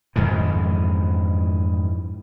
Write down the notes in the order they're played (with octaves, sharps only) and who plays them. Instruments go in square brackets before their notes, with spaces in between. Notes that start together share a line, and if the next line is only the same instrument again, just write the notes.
[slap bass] F2 G#2 D#3 E3